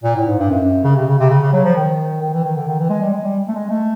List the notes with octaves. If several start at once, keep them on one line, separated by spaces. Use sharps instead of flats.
A#2
A2
G#2
G2
F#2
C#3
C3
C#3
C3
C#3
C#3
F#3
F3
D#3
D#3
E3
D#3
D3
D#3
E3
G#3
G3
G#3
G3
A3
G#3
A3